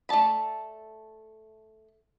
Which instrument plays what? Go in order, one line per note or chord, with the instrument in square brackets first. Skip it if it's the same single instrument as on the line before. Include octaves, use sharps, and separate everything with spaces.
[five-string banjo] A3 A4 D5 A5 B5